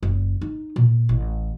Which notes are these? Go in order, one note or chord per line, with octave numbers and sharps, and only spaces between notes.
F#1
D#4
A#2
A1